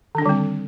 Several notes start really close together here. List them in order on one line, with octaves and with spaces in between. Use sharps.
D#3 D4 D3 G3 C4